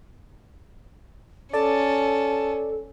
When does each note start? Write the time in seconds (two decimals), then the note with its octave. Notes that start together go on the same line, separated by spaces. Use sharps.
1.53 C#4 A4 D5 A5